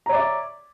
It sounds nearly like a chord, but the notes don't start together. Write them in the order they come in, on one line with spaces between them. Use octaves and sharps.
A#5 C#5 D5 E5